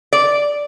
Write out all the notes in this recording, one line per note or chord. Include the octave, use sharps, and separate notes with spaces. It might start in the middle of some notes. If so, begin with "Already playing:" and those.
D5